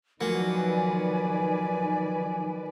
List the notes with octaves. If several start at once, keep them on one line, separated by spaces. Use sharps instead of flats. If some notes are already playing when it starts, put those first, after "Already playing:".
D#3 F3 F#3 A#3 F#4 B4 D5 G#5